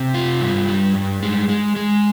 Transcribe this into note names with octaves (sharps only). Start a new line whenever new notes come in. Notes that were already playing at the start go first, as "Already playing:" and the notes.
Already playing: C3
F4
G2
G3
G2
G#3
G#3
G#3